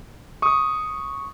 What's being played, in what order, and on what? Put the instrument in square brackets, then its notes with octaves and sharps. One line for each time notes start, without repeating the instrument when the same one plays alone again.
[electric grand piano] C#6 D#6